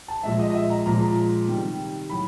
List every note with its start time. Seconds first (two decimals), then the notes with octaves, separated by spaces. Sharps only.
0.08 A5
0.23 A#2 F3 G#3 E5
0.39 D#5
0.50 D#5
0.54 E5
0.70 A#5
0.86 A#2 F3 G#3 A#5
1.48 C3 D#3 G3
2.10 A2 F#3 B5